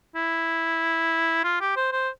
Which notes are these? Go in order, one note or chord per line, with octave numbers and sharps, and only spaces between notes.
E4
F4
G4
C5
C5